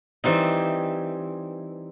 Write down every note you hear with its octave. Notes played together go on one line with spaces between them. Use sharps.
E3 G3 C4 D#4